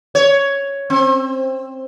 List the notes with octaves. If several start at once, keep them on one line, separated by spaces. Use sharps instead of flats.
C#5
C4